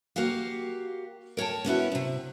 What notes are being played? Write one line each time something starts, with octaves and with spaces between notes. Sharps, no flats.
A#3 F#4 G4 F5
A#4 C#5 G5 A5
B3 C#4 E4 F#4
D#2 C3